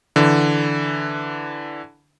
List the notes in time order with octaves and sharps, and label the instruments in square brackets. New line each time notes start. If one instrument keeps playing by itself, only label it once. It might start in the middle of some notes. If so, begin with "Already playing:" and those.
[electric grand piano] D3 E3